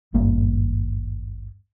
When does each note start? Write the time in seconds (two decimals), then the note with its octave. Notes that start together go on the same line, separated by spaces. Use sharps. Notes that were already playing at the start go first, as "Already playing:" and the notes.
0.14 D#1 G#1 G2 A#3